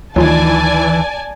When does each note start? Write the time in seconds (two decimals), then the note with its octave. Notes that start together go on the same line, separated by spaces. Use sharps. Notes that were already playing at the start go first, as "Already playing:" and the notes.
0.16 D2 D#3 E3 F#3 F4 D5 G#5 A5